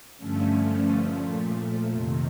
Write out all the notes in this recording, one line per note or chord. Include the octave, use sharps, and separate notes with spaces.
G2 D3 F3 A3 C#4
A#2 F3 A3
F2 C3 D#3